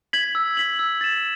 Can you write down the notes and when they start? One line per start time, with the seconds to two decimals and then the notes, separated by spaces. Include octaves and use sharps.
0.13 G#6 B6 F#7
0.35 E6
0.57 G#6 B6 F#7
0.79 E6
1.01 A6 E7